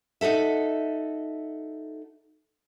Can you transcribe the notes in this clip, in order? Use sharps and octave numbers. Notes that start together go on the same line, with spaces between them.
D#4 F#4 A4 E5